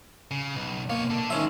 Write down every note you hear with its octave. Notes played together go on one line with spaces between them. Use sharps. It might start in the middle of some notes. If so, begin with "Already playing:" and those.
C#3
B1
B2 A#3 C#5
D4 A4
D#3 F3 G#3 C#4 E5